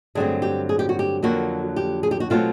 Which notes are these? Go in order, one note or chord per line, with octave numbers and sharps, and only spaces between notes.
G2 D3 F#3 A3 C4 G#4
G4
G#4
G4
F#4
G4
F2 D3 F#3 A#3 F#4
G4
G#4
G4
F#4
B2 F#3 A3 C4 F4